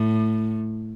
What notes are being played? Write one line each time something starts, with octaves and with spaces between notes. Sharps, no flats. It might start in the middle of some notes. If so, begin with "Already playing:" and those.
Already playing: A2